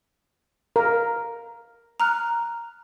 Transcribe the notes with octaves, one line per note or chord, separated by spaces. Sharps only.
A#4
A#5 F6 F#6